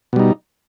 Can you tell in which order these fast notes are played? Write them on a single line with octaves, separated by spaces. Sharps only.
B2 G3 D#4